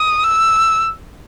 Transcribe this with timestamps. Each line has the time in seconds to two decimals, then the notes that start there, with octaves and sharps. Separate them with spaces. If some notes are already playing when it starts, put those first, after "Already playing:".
Already playing: D#6
0.24 E6